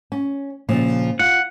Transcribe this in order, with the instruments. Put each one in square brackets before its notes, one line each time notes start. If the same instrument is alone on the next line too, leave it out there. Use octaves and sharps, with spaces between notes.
[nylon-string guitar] C#4
A#2 C#3 F3
[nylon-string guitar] F4 [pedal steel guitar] F#5